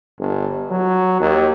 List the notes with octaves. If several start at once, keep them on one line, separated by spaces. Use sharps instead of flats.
G1
F#3
D#2